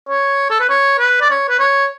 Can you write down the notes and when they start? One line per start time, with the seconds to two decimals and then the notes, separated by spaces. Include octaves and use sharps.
0.09 C#5
0.50 A4
0.60 B4
0.69 C#5
0.99 B4
1.21 D5
1.31 C#5
1.49 B4
1.60 C#5